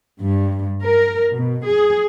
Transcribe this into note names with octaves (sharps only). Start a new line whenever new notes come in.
G2
A#4
B2
G#4